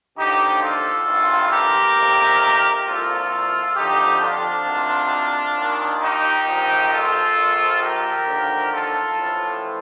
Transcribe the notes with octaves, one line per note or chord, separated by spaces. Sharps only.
D#2 D3 F3 D#4 G4
F4 A4
A1 G2 D#3
G4 A#4
F2 C3 D#3
C2 A#2 F3 F4 A4
F2 D3 F3 D#4 G4
D4 F4
D2 C3 D#3
D#2 D#3
D#4 G4
A#1 A#2 F3
F4 A4
A#1 A#2 F3
G4 A#4
D#2 D3 F3
F4 A4
A1 A2 F3